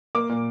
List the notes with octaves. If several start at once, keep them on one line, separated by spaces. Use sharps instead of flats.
A#3 D6
A#2